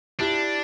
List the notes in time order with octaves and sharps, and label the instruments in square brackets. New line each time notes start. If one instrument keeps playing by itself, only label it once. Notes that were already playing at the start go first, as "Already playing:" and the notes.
[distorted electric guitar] D4 [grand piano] E4 G4